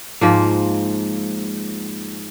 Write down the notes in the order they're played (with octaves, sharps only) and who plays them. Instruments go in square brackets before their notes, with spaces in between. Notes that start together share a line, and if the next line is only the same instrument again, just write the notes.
[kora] G#2 F3 A#3